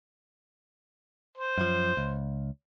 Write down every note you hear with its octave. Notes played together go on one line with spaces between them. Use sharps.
C5
F#2 F3
C#2